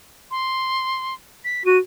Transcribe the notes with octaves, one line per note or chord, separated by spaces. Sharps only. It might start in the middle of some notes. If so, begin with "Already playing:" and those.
C6
B6
F#4 D#7